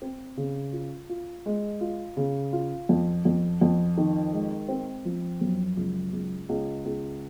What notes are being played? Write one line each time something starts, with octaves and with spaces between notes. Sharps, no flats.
C4
C#3
F4
F4
G#3
F4
C#3
F4
F2
F2
F2
D#3
G#3
C4
F3
F#2
C#2
C#2
C#2
C#2